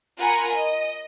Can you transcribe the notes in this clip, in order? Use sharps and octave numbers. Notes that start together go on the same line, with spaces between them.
F4 A#4 F#5 G#5 A#5 B5
D#5